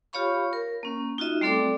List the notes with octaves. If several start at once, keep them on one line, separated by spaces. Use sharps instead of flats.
F4 G4 C#5 F5 B5 C#6
A#4
A#3 C#4
D#4 F4 F#4 D#5 E5
G3 A3 C4 A4 D5 D6